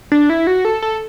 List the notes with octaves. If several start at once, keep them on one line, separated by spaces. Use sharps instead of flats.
D4
E4
F#4
A4
A4